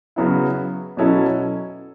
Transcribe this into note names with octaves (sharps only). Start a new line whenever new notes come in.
C#3 F#3 B3 E4
B2 F#3 C#4 E4 A4